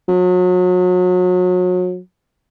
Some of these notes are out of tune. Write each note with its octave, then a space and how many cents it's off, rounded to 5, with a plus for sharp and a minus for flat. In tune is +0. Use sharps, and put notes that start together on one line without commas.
F#3 -35